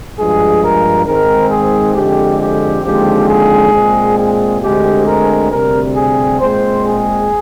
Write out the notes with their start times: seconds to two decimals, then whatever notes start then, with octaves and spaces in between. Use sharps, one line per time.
0.17 G2 F3 G#3 G#4
0.62 A#4
1.06 G#2 D#3 G#3 C4 A#4
1.50 G#4
1.95 F2 D3 G#3 C4 G4
2.40 G4
2.84 D#2 D3 F3 G#3 C4 G4
3.29 G#4
3.73 A#2 G#3 C4
4.18 G#4
4.62 D2 D3 G#3 C4 G4
5.06 A#4
5.51 D2 C3 G3 C4 A#4
5.95 G#4
6.40 A#2 G#3 C4 C5
6.84 G#4